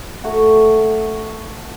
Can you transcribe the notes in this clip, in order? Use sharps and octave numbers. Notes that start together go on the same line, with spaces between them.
A3 F#4